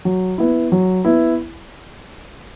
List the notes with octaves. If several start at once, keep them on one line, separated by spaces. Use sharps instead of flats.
F#3
B3 E4
F#3
B3 E4